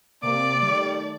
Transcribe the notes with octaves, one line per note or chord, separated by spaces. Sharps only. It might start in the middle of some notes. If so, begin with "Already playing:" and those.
C3 A#3 D5 D6
D#3 G3 A3